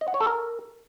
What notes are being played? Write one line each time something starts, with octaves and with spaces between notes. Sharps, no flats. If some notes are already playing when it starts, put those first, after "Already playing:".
D#5
F#5
C#5
A4
A#4